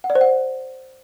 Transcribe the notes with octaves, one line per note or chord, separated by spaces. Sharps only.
F#5
D5
C5
F#5